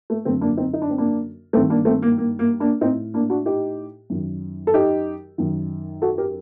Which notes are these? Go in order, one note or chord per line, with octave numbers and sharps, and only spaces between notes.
A3
F#2 D3 A3 C4
A#3 D4
C4 D#4
D#4
D4
C4
A#3 D4
G2 D#3 A3 C4
A#3 D4
A3 C4
A#3
A#3
A#3
A#3 D4
A2 C4 D#4
A#3 D4
D4 F#4
D#4 G4
F#2 D#3
A4
D#4 G4
F#2 D#3
F#4 A4
G4 A#4